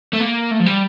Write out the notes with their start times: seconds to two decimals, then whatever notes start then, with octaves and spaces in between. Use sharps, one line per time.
0.13 A3
0.20 A#3
0.51 A3
0.60 F3
0.66 G3